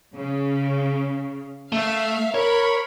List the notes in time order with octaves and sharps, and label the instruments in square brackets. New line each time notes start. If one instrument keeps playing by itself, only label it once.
[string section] C#3
[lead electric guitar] A3 [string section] E5 F5
[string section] A#4 B5 [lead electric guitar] C#5